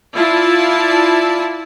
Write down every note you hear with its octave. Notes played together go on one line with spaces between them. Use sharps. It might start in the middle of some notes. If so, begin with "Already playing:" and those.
E4 F4 D5 A5